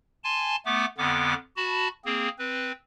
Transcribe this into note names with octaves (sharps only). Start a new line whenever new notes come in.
G#5 A5 C6
A3 B3 D6
F2 D3 B3 D6
F#4 A5 B5
A#3 C4 G#4
C4 B4